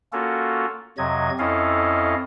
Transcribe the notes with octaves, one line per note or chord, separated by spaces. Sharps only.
A#3 C#4 F4 F#4 A4
F2 C3 F#3 D#5 G#6
F2 C#4 E4 A4 D#5 F5